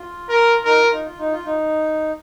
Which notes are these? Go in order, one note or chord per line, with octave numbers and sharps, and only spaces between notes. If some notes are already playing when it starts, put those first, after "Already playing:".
Already playing: F4
A#4
D#4 A#4
F4
D#4
F4
D#4
F4
D#4